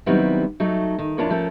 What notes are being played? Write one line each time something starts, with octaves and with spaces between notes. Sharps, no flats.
D#3 F#3 G3 B3 C4 E4
F#3 A3 D#4
D#3
F2 D4 E4 F4 A#4 C#5
F3 A3 C#4 A#4